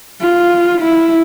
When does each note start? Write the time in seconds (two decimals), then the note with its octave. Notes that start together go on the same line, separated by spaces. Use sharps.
0.21 F4
0.81 E4